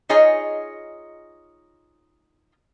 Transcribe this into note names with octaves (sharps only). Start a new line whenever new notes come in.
D#4 F4 G#4 C#5 D#5 G#5